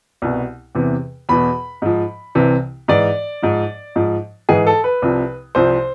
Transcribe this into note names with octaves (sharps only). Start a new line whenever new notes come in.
C2 B2
E2 C3 E3
E2 B2 B5
G#2 F3
C2 C3 E3
G#2 E3 D5
G#2 F3
G#2 F3
G#2 E3 G#4
A4
B4
C2 C3 F3
C2 C3 F3 C5